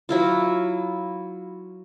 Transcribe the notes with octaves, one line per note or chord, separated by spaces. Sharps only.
F#3 E4 F4